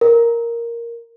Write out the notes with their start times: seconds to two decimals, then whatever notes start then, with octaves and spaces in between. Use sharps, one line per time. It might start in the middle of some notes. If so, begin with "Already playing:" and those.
0.01 A#4